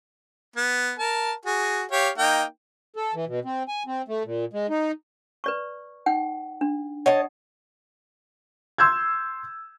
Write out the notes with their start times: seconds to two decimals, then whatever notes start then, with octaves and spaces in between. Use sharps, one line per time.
0.56 B3
0.99 A#4 A5
1.45 F#4 G#4
1.91 G4 C#5 F5
2.18 A#3 D#4 G5
2.96 A4
3.14 E3
3.27 B2
3.45 C4
3.68 G#5
3.87 C4
4.08 A3
4.25 A#2
4.53 G#3
4.70 D#4
5.44 B4 D5 C#6
6.06 D#4 F#5 G5
6.61 D4
7.06 C#5 D#5 F#5 A5
8.78 C6 E6 G6 G#6